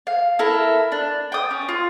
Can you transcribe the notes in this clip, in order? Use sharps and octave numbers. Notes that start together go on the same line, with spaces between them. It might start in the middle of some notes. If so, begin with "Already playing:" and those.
F5
E4 A4 A#4
D4
G5 D#6
C#4
F4